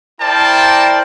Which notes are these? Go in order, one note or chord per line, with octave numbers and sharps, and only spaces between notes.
E4 A#4 C5 D5 G5 A5